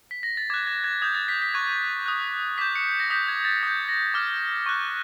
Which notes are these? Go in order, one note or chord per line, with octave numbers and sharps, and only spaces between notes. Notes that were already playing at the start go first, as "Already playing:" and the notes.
B6
A#6
A6
D6 F#6 G#6
G#6
G#6
D#6 G6 G#6
A6
B6
B6
C#6 F#6 G#6
D#6 F#6
D6 G6 B6
C#7
A#6
D#6 G6 B6
G#6
A6
D#6 G6 B6
A#6
D6 F6
C#6 F#6